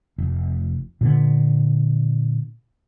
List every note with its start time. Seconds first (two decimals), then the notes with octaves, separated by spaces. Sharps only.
0.18 F1
1.01 A#2 D3 B3